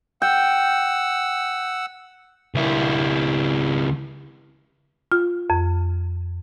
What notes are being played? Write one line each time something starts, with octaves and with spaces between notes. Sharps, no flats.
F#5 G5 E6
C#2 E4
F4
F2